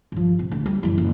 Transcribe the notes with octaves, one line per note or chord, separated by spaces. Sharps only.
G2 F3
C3
D2
G3
F#2 E3
F#1